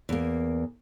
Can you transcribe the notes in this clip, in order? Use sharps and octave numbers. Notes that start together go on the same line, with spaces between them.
E2 A#3